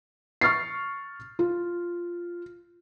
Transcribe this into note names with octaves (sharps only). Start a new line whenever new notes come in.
C#6 F6 A6 C7
F4